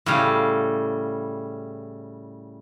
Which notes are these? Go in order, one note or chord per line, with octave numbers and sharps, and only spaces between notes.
A2 C#3 G3 F5